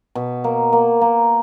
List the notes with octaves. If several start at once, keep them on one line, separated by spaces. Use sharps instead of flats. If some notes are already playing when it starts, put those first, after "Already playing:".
B2
A#3
A#3
A#3